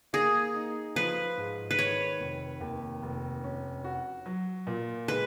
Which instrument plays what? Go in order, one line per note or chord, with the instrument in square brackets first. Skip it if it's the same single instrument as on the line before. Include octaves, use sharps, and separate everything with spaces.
[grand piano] A#3 [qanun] G#4
[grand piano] D#4
[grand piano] F3 [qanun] B4
[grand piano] G#2
[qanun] B4
[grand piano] D#3 [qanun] C#5
[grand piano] F1
D#2
F1
C#4
F#4
F#3
A#2
[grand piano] G#3 [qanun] B4